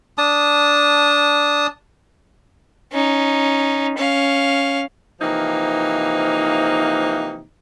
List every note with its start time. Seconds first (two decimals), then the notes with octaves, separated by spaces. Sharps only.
0.18 D4 A5 D#6
2.92 C#4 D#4
3.97 C#4 F5
5.21 C3 E3 F3 A#3 D#4